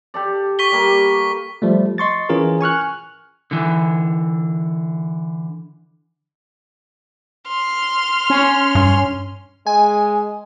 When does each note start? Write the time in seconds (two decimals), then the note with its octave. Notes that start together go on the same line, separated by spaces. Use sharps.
0.14 G4 A4 D5
0.59 C#6 B6 G7
0.72 G3 A#3 A4
1.62 F3 G3 A3
1.98 D#5 C6 C#6 A6
2.29 E3 C#4 F4 G#4 A#4
2.61 G#5 C#6 F6 F#6
3.51 D3 E3
7.48 C6 F6
8.30 C#4
8.75 G2
9.67 G#3 G#5